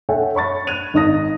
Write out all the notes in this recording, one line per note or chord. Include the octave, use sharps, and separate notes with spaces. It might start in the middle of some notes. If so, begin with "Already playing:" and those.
A4 C#5 E5 F#5 G5
C#5 B5 C#6 A6
F#6 G#6 D#7 F7
G#1 D#4 D#6 A#6